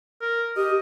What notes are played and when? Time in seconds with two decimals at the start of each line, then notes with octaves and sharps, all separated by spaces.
0.21 A#4
0.57 G4 D#5